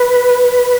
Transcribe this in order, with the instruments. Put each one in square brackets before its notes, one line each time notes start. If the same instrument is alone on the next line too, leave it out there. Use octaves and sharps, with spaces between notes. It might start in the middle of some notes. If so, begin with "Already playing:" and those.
Already playing: [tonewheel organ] B4